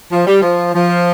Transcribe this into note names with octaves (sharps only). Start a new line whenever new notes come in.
F3
G3
F3
F3